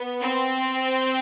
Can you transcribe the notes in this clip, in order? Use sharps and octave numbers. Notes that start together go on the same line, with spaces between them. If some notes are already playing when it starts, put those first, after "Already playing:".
Already playing: B3
C4